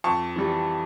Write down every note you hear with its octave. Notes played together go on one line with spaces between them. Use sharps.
F2 A5 C#6
E3 G3